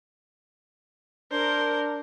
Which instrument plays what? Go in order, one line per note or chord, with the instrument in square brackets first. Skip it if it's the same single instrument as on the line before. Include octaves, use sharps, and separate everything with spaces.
[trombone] D4 [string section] A#4 [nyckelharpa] C5